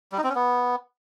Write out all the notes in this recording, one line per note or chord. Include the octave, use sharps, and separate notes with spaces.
G3
D#4
C4
C#4
B3